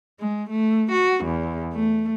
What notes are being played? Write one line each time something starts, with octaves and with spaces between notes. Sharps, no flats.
G#3
A3
F#4
E2
A3